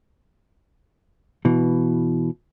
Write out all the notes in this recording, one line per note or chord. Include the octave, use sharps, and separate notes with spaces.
B2 E3